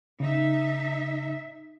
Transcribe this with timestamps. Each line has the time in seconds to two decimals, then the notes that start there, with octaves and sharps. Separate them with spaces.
0.20 C#3 D#4 E5